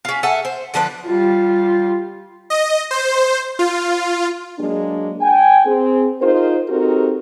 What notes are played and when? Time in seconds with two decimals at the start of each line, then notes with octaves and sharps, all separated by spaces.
0.05 C#4 F4
0.23 A4 E5 F#5 G#5
0.45 C5
0.74 D3 F3 D4 B4
1.05 G3 F4
2.50 D#5
2.91 C5
3.59 F4
4.59 F#3 G#3 A#3 D4
5.21 G5 G#5
5.66 C4 G#4
6.22 D#4 F4 G#4 A#4 C5
6.69 C4 D#4 F#4 G4 A4 A#4